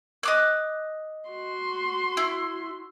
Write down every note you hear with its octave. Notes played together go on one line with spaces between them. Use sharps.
D#5 D6 F#6
F#4 C6
E4